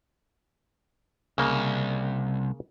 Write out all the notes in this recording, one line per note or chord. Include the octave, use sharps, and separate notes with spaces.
C2 C#3 A#3